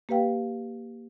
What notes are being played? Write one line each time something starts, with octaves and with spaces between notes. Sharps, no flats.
A#3 G4 B4 F5 G5